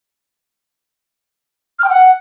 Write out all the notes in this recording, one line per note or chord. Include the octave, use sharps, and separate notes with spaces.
F6
G5
F#5